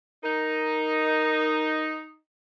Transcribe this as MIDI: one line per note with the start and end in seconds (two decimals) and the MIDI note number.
0.24 2.17 63
0.24 1.99 70